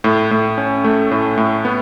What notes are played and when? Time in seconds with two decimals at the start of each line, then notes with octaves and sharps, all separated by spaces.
0.04 A2
0.31 A2
0.58 C#4
0.84 A3
1.11 A2
1.37 A2
1.65 B3